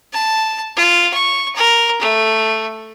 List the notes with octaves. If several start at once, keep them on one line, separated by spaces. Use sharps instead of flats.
A5
F4
C#6
A#4
A3